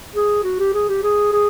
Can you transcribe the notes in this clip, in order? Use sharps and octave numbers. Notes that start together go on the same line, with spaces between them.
G#4
F#4
G4
G#4
G4
G#4
G#4